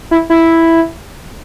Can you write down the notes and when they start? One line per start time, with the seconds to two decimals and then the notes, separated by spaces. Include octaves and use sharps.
0.11 E4
0.30 E4